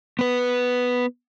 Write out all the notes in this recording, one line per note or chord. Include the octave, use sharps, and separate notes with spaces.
B3 B4